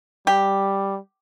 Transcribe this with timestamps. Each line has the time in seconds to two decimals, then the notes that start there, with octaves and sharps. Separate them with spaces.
0.27 G3 G4